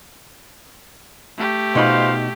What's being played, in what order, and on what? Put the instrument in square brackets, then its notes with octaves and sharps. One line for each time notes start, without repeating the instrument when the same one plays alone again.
[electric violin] A3 G4
[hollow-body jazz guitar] B2 D#4 B5 [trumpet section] F4 C5 F5